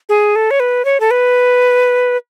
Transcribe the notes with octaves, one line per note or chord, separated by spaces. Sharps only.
G#4
A4
C#5
B4
C#5
A4
B4